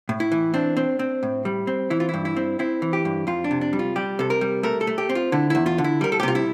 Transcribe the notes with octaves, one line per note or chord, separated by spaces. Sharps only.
A2
E4
E3
C4 D4
C4
C4
A2
G3
C4
E3 E4
F4
G2 E4
E4
C4
C4 E4
E3
G4
G2
F2 F4
D4
C3
D4
G3
F4
G3 G4
C3 A4
A#4
G3
A3 A#4
A4
A3
G4
C4
F4
D3 E4
E2 E4
F4
D3
E4
G3 A#4
A4
G4
C3 F4
E4